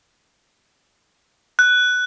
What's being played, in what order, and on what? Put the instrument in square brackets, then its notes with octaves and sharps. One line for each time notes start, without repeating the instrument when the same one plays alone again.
[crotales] F#6